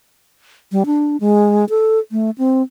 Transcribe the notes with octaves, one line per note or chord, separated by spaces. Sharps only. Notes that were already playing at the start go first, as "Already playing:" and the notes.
G3
D4
G#3
A4
A3
C4